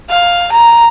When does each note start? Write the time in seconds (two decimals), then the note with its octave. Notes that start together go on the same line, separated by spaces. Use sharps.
0.10 F5
0.53 A#5